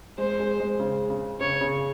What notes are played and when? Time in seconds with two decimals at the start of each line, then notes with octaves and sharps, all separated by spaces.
0.18 G#3 C5
0.39 G#3
0.60 G#3
0.80 C#3
1.10 C#3
1.40 C#3 C#5
1.61 C#3